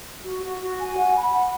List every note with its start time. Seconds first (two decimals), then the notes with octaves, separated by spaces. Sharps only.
0.23 F#4
0.42 F#4
0.60 F#4
0.78 G#5
0.96 F#5
1.15 B5
1.33 F#5